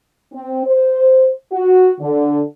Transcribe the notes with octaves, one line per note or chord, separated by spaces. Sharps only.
C4
C5
F#4
D3